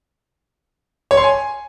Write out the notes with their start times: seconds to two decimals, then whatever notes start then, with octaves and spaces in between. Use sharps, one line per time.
1.11 C#5
1.17 C6
1.24 G#5